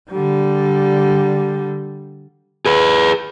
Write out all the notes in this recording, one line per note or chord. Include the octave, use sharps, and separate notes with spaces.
D3 G3
G#4 B4